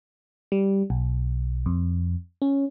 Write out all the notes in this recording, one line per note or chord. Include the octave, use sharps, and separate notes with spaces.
G3
B1
F2
C#4